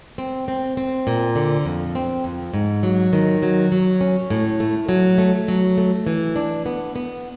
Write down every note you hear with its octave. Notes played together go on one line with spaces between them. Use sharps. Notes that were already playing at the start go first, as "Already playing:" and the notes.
C4
C4
C4
A#2
D3
F2
C4
F2
G#2
F#3
D#3
F#3
F#3
C#4
A2
A3
F#3
A3
F#3
A3
E3
D4
B3
B3